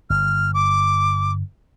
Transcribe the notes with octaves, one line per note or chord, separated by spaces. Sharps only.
G1 F6
D6